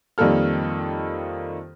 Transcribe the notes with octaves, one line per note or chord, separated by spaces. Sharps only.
F2 D#3 G3 A#3 A4 F6